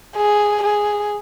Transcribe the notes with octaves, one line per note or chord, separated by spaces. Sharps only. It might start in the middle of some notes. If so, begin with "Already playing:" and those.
G#4
G#4